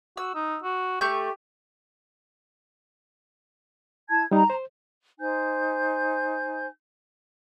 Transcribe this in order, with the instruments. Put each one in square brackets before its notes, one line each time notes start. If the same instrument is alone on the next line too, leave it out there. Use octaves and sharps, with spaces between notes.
[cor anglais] F#4 [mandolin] E6
[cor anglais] D#4
F#4
[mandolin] A3 C#6 G6 [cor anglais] G4
[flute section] E4 A5 G#6
[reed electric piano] G3 D#4 [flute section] A#5
[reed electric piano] C5
[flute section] D#4 C5 G#5 G6